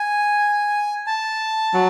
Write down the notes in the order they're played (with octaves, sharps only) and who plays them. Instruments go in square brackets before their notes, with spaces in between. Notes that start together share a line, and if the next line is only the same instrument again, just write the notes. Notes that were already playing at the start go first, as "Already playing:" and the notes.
Already playing: [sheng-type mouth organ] G#5
A5
[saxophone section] F#3